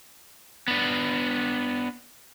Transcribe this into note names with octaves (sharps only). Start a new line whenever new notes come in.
B3 D4